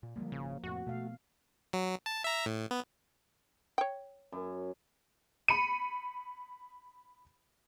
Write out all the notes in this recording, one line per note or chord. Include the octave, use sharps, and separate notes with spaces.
A#2
D3 F3 G3 G#3 A#3
G#1 C#3
F2 A2 C3 F#4
B2 A3 F5
F#3
A5
E5 A#5
A2
B3
C#5 G5
F#2
B5 C#7 D#7